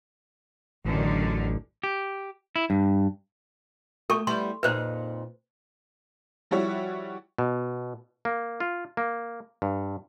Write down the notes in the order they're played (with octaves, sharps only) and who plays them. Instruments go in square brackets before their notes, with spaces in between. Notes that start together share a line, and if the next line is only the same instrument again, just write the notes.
[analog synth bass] A1 [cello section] F#2 D3 D#3
[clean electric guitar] G4
E4
G2
[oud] A3 [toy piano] A4 C#6
[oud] G3 B3 E4 [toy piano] C6
[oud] F2 A#2 D#4 [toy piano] B4 C5
[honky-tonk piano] F3 G3 E4 F#4 C#5 E5
[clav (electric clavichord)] B2
A#3
F4
A#3
G2